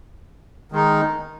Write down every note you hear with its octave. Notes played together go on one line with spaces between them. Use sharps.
D#3 G#3 D#4